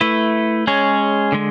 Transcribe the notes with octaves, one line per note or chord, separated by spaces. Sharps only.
A3 E4 B4
G#3 C#4 G#4 C#5
D3 G#3